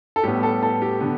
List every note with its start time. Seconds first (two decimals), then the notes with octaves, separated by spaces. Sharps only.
0.16 A4
0.23 A2 G3 B3 G4
0.43 A4
0.63 A4
0.82 G4
1.00 D3 B3